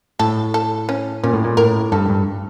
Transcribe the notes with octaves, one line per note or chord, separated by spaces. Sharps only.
A2 A4
A4
C#4
A#2 C#4
A2
A#2
A2 A#4
G2 A4
G2